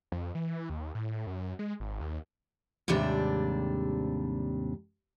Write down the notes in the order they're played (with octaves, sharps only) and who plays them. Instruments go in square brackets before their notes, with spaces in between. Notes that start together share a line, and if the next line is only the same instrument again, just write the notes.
[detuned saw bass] F2
E3
D#2
A2
F#2
G#3
G#1
D#2
[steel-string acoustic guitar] D#2 G#2 C3 G3 D4